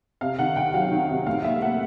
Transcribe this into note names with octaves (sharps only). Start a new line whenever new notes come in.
C3 F5
D#3 F#5
D#3 G5
F#3 F5
D#3
C3
A2 F5
A#3 E5
A#3 F#5